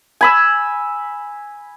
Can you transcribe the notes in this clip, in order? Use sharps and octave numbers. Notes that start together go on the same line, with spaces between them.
G#5 B5 E6